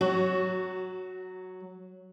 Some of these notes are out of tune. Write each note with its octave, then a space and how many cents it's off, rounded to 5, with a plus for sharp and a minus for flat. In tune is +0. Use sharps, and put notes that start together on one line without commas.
F#3 +0 F#4 +25